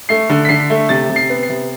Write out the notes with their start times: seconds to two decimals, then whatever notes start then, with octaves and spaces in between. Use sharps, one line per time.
0.09 A3 C7
0.29 D3
0.45 B6
0.49 D3 C7
0.70 A3
0.89 C3 A6
1.09 C3
1.16 C7
1.30 B3
1.43 C7
1.49 C3